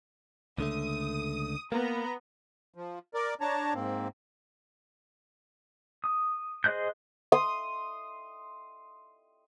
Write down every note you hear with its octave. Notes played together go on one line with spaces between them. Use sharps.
C#2 D3 A3 D#6
A#3 B3 A#5
F3
A#4 D5
D4 C#5 A5 A#5
G#2 A#3 C4
D#6
G#4 C5 D#5 F#6 G6
C6 D#6